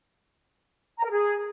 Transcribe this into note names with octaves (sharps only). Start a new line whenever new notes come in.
A#5
A#4
G#4